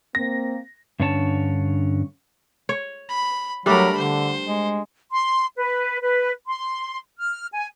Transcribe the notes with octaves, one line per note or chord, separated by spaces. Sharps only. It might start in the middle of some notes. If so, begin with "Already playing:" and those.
A#3 C4 A#6
G2 D3 C#4 C#5 A5
C#5
B5
F#3 G3 A3 D4 A#4 B5
D3 C5
G#3
C6
B4
B4
C6
F6
G#5